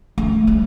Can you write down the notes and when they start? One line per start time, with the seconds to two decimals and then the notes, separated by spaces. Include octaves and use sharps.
0.18 A3
0.47 G3